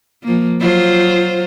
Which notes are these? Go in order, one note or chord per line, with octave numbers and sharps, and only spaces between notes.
F3 A#3
F#3 F4 C5